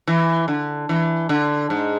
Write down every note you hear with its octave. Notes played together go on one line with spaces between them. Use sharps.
E3
D3
E3
D3
G#2